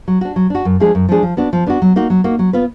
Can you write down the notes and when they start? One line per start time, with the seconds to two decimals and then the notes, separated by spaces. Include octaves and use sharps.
0.08 F#3
0.21 D4 F#4
0.36 F#3
0.50 D4 F#4
0.65 F#2
0.80 F3 G#3 D4 G#4
0.95 F#2
1.09 F3 G#3 D4 G#4
1.23 F3
1.37 B3 D4 F#4
1.53 F3
1.66 B3 D4 F#4
1.82 F#3
1.96 A#3 D#4 F#4
2.10 F#3
2.24 A#3 D#4 F#4
2.39 F#3
2.53 B3 F4 B4